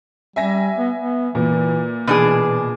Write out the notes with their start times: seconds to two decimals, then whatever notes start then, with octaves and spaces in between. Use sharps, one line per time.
0.36 G3 E5 G#5 A#6
0.78 B3
0.99 B3
1.35 A#2 E3
2.07 B2 E3 D4 G#4